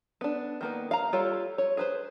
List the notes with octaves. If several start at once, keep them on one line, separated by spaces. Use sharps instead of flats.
B3 D4
D#3 A#3 B3
F5 A#5
G3 F4 A4 C#5
C#5
G#4 B4 C5